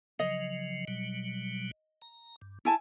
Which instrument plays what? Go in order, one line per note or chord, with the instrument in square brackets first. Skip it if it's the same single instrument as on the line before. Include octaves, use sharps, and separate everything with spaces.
[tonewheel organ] C#3 F3 F#3 [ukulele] D#5
[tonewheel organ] B2 F#3 G3
A#5
G2
[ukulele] E4 G#5 A5 [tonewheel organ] G#4